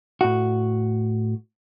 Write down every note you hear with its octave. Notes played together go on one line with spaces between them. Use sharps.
A2 F#4